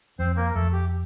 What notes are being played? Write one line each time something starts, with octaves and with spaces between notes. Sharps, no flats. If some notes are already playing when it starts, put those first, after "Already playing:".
F2 C4 C5
A#3 A#4
A#4
F2 A3 A4
G4